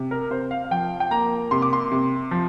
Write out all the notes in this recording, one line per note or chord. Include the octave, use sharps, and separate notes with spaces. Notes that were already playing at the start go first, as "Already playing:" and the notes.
Already playing: C3
A#4
C3 C5
F5
F5
F3 G5
G5
A#3 A#5
C3 C6
D6
C6
C3
F3